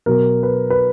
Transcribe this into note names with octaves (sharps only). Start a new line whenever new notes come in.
B2 F#3 A#4
B4
B4